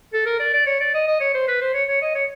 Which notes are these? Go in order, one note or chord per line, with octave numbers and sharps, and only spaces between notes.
A4
A#4
D5
D5
C#5
D5
D#5
D#5
C#5
C5
B4
C5
C#5
C#5
D#5
C#5